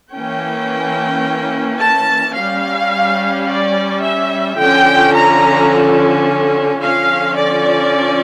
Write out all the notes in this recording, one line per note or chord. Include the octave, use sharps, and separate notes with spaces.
E3 A#3 C#4 G5
A5
G3 C#4 F5
D5
E5
D3 F3 C#4 G5
A#5
D3 F3 C#4 F5
D5